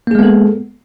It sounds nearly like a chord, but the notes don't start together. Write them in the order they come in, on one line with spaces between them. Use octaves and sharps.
A#3 G#4 G#3 B3 A4